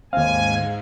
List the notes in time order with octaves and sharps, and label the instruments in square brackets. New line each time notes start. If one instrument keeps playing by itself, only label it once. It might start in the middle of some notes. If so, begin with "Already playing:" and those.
[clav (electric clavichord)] D#2 C4 [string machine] G#2 [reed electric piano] F5 [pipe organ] G#5